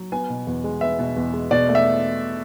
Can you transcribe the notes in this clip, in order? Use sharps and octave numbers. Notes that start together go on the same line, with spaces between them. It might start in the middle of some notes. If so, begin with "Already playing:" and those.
Already playing: F#3
B3 G#5
B2
E2
G#3
B3 E5
B2
E2
G#3
B2 D5
A3
E5